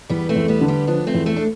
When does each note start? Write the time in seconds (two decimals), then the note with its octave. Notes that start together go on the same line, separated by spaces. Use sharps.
0.10 E2 G3 B3
0.29 A3 C4
0.36 E2
0.48 G3 B3
0.61 D3
0.68 G3 B3
0.87 F3 B3 D4
1.07 A3 C4
1.14 E2
1.26 A3 C4
1.36 D4